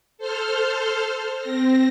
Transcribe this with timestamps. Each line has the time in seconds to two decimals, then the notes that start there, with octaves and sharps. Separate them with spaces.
0.18 A4 C5 C6 F6
1.40 C4 A#6